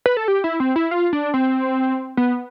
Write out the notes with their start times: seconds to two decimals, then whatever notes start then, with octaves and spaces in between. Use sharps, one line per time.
0.06 B4
0.17 A4
0.28 G4
0.44 E4
0.60 C4
0.76 E4
0.91 F4
1.13 D4
1.34 C4
2.17 B3